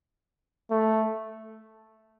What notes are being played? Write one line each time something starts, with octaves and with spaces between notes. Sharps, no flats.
A3